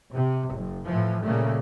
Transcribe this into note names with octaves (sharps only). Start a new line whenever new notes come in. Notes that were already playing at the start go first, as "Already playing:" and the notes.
C3
F#1
A2 E3 F3
A#2 C#3 G3 A3 A#3